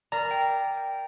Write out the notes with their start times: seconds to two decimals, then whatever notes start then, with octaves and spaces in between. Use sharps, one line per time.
0.12 A#4 D5 A#5
0.31 G5
0.77 G5